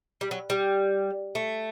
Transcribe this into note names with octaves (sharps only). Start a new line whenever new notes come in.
G3
F#3
G3
A3